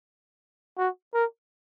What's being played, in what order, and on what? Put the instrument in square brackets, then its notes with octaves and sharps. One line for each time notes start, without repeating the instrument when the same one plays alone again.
[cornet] F#4
A#4